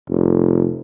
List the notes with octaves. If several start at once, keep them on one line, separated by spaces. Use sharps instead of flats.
F1